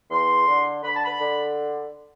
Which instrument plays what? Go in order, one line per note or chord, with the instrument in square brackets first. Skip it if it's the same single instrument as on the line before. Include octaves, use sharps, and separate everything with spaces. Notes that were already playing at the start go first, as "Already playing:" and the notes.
[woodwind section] E2 C6
D3
D3 B5
A5
B5
D3